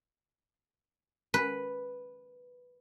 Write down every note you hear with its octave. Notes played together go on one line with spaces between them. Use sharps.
B4